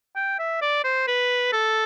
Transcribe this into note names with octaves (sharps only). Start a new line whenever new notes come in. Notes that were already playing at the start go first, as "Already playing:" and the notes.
G5
E5
D5
C5
B4
A4